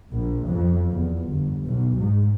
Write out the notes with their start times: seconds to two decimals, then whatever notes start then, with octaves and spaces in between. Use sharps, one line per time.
0.13 A#1
0.48 F2
0.90 E2
1.29 G1
1.65 B1
1.98 G#2